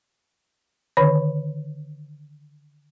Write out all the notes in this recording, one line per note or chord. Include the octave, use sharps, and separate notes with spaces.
D3 D#3 C#5